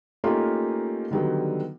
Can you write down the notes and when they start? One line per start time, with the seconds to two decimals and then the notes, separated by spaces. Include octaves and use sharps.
0.24 A3 A#3 C#4 D#4 F4 G4
1.11 D3 D#3 F#3 G3 B3